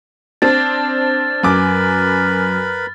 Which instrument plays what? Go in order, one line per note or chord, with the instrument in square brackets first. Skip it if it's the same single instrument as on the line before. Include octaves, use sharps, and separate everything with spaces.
[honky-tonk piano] C4 D4 [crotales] F6 A6
[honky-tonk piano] F#2 D6 [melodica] A#4 B4 B5